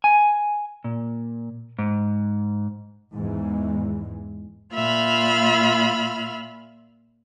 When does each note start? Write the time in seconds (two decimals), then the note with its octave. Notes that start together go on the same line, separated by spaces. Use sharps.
0.04 G#5
0.84 A#2
1.79 G#2
3.14 E2 G#2 E3 G#3
4.74 A#2 F4 E5 B5 F6